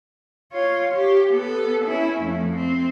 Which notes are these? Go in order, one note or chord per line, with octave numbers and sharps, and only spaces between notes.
F4 C#5
G4
B3 A4
C#4 E4
F2 A3
C4